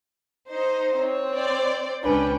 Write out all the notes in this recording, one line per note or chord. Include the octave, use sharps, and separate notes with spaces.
D#4 C5
C4 C#5
C5 D5
C#2 C#4 D4 B4 G5